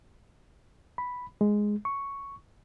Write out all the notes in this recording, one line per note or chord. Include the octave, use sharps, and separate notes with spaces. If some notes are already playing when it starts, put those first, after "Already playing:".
B5
G#3
C#6